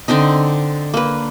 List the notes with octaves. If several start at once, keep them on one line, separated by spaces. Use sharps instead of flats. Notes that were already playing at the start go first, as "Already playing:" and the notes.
D3 C4 D4 D#4
A#3 B4